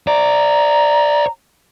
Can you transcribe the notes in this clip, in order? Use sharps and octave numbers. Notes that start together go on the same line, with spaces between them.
C5 D5 A#5